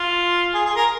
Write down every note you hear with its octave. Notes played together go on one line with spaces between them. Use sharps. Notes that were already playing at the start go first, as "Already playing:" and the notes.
Already playing: F4
G#4
G#4
A#4